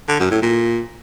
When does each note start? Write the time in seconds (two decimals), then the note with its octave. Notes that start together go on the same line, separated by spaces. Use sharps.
0.08 D3
0.20 F#2
0.31 A2
0.42 A#2